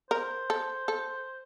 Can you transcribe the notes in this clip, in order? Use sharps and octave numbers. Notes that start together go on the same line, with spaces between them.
A#4 C5
A4
A4